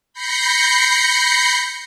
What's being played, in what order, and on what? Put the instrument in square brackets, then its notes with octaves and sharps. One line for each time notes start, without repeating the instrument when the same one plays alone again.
[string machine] B5 G6 A#6 C7 C#7